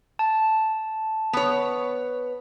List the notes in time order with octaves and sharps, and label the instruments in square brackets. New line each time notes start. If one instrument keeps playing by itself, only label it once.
[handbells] A5
[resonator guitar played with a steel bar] B3 C#5